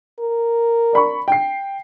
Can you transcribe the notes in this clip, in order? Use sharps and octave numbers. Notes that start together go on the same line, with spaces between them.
A#4
D5 B5 C#6
G5 C7